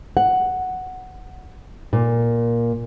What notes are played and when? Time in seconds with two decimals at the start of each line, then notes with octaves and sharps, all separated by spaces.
0.17 F#5
1.93 A#2